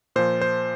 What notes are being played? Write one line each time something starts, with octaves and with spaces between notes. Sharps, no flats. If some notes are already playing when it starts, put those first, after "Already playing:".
A#2 F3 C5
C5